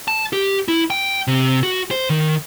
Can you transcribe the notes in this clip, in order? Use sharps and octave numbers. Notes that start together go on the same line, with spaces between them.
A5
G4
E4
G5
C3
F#4
C5
D#3